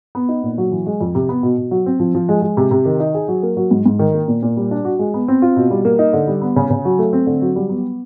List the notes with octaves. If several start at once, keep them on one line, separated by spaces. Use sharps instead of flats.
B3
D#4
A#2
F#3
E3
G#3
F2
C3
B3
B2
B2
F#3
C4
F3
F3
G#3
G#3
C3
C3
D#3
D#4
G#4
F#3
A#3
F#3
G#2
G#2
D#3
A#3
A#2
A#2
G3
D4
F#4
G#3
B3
C4
F4
B2
G3
A#3
D#4
D3
G3
B3
C#3
C#3
F#3
A3
C4
D3
F#3
G3
B3